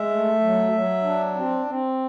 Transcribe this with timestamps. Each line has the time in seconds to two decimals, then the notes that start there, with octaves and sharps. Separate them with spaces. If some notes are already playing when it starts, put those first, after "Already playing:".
Already playing: G#3 E5
0.10 A3
0.41 F#3
0.72 F#3
1.03 D4
1.35 C4
1.66 C4